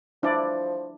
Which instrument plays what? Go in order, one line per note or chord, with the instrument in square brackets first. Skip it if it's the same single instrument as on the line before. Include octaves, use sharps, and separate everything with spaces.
[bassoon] F3 [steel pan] D4 E4 D5